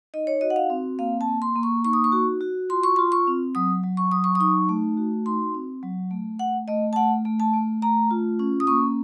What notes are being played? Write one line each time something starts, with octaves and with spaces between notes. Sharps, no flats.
D#4 D#5
C#5
F#4 D#5
F#5
F5
C4
A#3 F5
A5
A#3
C6
A#3
C#6
D#4 C#6
D#6
C#6
F#4
F#4
F4 C6
C#6
F4 C6
C#6
C4
F#3 D#6
F#3
C#6
F#3 D#6
C#6
D#6
D#4 C#6
A3
F#4
D#4 C6
C4
F#3
A3
A3 F#5
A3 D#5
A5
A3 F#5
A3
A5
A3
A3 A#5
F4
C#4
D#6
A#3 C#6